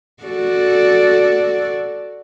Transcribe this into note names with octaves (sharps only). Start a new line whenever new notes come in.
F#4 A4 D5